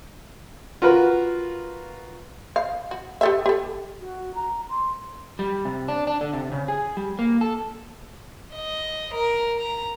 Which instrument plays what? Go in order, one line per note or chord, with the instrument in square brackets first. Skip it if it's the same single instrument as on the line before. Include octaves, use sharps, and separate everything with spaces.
[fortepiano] F4 F#4 A#4 B4
[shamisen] F5
F#4
G4 A4 E5
G4 A4
[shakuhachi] F#4
A#5
C6
[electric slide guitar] G3
C3
D4
D4
D3
C3
C#3
G#4
G3
A#3
A4
[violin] D#5
A#4
A#5